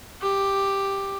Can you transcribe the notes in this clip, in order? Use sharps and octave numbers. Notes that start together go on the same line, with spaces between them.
G4